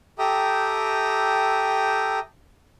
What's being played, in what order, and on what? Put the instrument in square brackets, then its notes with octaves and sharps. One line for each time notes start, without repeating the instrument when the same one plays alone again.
[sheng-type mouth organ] G4 A4 E5 G5 A#5 D#6